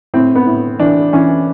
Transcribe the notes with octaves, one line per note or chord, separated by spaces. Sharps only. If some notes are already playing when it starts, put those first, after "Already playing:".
A2 C4
B3
A2
E3 D4
E3 C#4